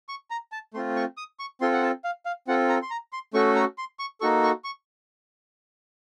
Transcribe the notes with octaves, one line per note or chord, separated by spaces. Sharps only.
C#6
A#5
A5
A3 C4 F4 C6
C#6
D#6
C#6
C4 F4 A4 C6
F#5
A5
F5
F5
C4 F4 A4 F#5
A#5
C6
A#5
C6
A3 C#4 F#4 A4 C#6
A#5
C6
C#6
A#3 D#4 F#4 A4 C#6
C#6
C#6